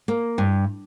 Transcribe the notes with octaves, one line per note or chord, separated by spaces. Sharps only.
A#3
G2